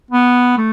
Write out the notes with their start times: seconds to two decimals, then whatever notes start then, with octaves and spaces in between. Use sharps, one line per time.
0.11 B3
0.58 A3